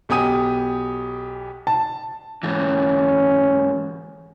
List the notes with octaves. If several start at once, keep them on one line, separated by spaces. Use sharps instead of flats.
B1 B3 G4 G#5 D#6 D#7
A5
G#2 E3 C#4